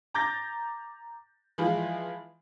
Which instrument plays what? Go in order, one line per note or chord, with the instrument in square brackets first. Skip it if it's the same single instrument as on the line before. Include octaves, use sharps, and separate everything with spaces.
[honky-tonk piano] A#5 D6 G6 A6 A#6
E3 F3 G#3 E4 F4